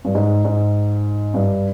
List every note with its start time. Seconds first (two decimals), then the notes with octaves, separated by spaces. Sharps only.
0.05 G2
0.15 G#2
0.44 G#2
1.34 G2